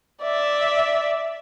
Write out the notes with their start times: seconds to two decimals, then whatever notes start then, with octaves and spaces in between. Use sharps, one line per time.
0.22 D5 E5